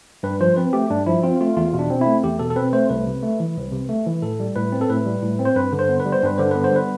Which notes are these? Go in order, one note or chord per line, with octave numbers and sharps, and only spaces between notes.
G2 B4
F3 C5
C4 B4
A3 G4
G2 D4
F3 E4
C4 F4
A3 F4
E2 F4
B2
D4
C4
A3 E4
E2 G4
B2 A4
A4
C4 B4
A3 C5
C2 B4
C3
A3
E3
C2
C3
A3
E3
A2 A4
G3
A2 B4
C4
A4
A2 B4
G3
A2
C4
C5
G2 B4
D3
C5
B3
B4
G3
C5
G2 B4
D3 C5
B3 B4
C5
G3 B4